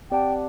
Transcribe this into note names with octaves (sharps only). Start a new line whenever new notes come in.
C4 G4 D5 F#5 G5 A5